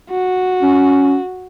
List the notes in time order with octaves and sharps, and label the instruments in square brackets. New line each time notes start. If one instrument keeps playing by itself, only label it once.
[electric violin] F#4
[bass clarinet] C#4